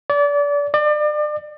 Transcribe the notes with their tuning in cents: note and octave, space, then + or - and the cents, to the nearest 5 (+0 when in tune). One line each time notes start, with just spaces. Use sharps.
D5 -30
D5 +35